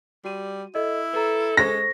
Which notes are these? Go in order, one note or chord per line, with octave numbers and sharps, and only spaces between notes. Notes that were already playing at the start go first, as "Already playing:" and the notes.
G3 F#4 D#7
E4 A4 D#5
A4 B4 A#5
G#3 C5 C#6 A#6